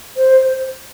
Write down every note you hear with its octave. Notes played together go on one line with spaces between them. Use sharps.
C5